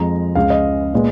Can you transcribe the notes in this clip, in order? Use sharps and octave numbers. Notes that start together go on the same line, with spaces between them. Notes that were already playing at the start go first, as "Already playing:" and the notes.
Already playing: F2 F3 G#3 A#5
C#2 C#3 G#3 F5
D#5
A#2 G#3 B3